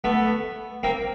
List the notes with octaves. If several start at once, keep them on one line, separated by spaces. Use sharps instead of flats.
A3 B3
A#3 C4